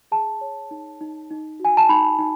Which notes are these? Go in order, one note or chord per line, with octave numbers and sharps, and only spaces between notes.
G#4 A5
C#5
D#4
D#4
D#4
F#4 G#5
A5
D#4 B5
D#4